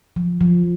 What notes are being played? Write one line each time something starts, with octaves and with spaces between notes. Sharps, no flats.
F3
F3